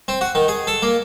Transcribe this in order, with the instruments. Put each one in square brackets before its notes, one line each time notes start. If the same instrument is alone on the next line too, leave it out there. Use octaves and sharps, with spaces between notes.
[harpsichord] C4
F#4
D#3
G#4
A4
A#3